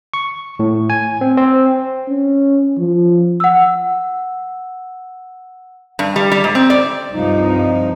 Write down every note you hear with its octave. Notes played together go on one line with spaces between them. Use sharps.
C#6
A2
G#5
C4
C4
C#4
F3
F#5 E6
G2
G3
G3
G#2
C4
D5
C2 G2 F3 D#4